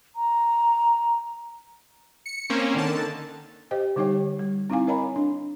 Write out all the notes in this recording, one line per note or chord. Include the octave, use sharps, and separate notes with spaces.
A#5
C#7
A#3 C4 C#4
D3 D#3 A5
G4 C5 D#5 G5
D3 G3 D#4 G4 C#5 G5
G3
C4 D#4 E4 F5 G#5
A#4 C#5 D#5 G#5 A#5 B5
D4